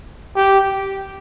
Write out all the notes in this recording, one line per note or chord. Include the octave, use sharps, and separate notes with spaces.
G4